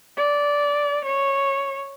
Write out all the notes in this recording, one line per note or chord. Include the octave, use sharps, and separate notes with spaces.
D5
C#5